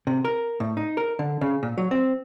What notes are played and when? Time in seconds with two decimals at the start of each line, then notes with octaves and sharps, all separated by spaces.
0.07 C3
0.25 A#4
0.60 A2
0.77 D#4
0.97 A#4
1.19 D3
1.41 C#3
1.63 A#2
1.78 F#3
1.91 C4